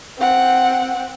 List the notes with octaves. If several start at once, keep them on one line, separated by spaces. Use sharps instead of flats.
C4 F#5